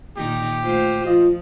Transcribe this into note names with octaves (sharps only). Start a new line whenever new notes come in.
A#2 D#3 D#4 G4
A3 F4 C5
F3 F4 D#5